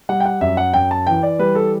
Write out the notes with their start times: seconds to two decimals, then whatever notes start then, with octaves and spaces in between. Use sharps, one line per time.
0.09 G3 F#5
0.20 G5
0.25 F#5
0.41 F#2 E5
0.57 F#5
0.74 F#2 G5
0.91 A5
1.07 E3 G5
1.23 D5
1.39 G3 B4
1.55 A4